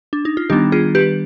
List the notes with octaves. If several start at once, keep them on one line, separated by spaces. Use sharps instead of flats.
D4
D#4
F4
D#3 G3 B3 D4 D#4 G4
F4 G#4
G4 B4